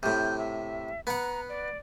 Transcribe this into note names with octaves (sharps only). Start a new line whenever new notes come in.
A2 C3 G6
E5
B3 F#5 A#5
D5